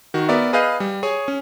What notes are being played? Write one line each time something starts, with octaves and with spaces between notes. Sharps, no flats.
D#3 F#4
B3 A#4 D5 E5
G#4 B4 D#5 F5 G6 D#7
G3
G#4 C#5 G#5
C#4